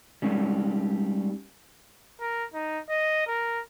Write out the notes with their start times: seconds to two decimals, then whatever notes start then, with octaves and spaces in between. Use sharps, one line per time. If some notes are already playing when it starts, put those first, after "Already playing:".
0.22 G3 G#3 C#4 D#4
2.20 A#4
2.54 D#4
2.90 D#5
3.27 A#4